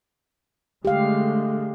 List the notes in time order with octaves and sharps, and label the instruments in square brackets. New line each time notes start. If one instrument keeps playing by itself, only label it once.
[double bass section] D3 G#3 A3 [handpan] G4 F5